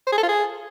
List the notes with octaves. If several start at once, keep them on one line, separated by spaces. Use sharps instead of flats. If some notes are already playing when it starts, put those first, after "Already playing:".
C5
G#4
A4
F4
G#4